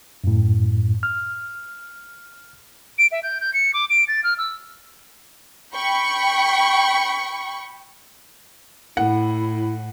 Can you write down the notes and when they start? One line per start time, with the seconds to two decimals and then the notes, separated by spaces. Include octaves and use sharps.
0.24 F#2 A2
1.03 F6
2.98 D7
3.12 E5
3.23 G6
3.41 G6
3.54 C#7
3.74 D6
3.90 D7
4.08 A6
4.24 F6
4.38 E6
5.74 G5 B5 C#6
8.97 A2 E4 F#5